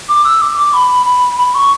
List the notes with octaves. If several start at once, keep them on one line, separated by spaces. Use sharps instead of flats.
D6
E6
D6
D6
B5
B5
B5
C#6